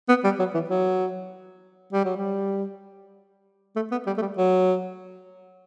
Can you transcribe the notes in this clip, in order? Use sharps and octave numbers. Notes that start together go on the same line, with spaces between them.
B3
G3
F#3
E3
F#3
G3
F#3
G3
A3
B3
G3
A3
G3
F#3